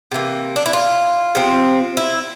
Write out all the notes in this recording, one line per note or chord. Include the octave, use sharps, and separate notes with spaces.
C3 E3 A#3
D4
E4
F4
C3 F3 C4
E4